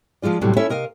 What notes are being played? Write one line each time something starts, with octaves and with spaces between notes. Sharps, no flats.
F3 F#3 G#3 F4 D5
D2 A2 C3 F#3 G3 C4
C#4 E4 A4 C#5 E5
C3 A#4 D#5 F5